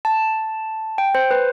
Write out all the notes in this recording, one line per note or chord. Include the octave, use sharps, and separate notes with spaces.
A5
G5
C5
B4